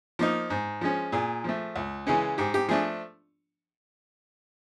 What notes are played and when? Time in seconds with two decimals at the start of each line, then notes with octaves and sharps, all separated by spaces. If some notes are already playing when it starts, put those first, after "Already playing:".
0.19 F3 A#3 D#4
0.50 G#2
0.81 F3 G#3 C#4
1.12 A#2 G#4
1.44 F3 A3
1.76 C#2
2.07 C#3 E3 G#3 C#4
2.38 G#2 G4
2.54 G4
2.68 F3 A3 D4 G#4